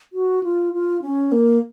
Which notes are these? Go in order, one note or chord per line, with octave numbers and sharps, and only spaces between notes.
F#4
F4
F4
C#4
A#3